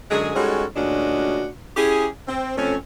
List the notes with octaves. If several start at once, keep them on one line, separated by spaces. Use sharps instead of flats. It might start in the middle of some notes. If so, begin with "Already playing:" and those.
F#2 D3 F#3 G#3 G#4
G3 G#3 C#4 D#4 F#4 A4
D2 A#2 G#3 C#4 D4 F#4
C#4 E4 G4 G#4
C4
F2 A3 C4 C#4